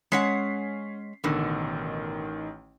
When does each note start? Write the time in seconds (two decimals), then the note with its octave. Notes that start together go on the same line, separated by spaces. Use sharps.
0.12 G#3 C#4 C#5 F#5 B6 C7
1.24 A1 B2 D3 D#3